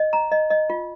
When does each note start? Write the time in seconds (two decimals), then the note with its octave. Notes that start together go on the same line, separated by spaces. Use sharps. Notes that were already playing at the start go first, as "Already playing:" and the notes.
Already playing: D#5
0.13 A#5
0.32 D#5
0.50 D#5
0.70 F4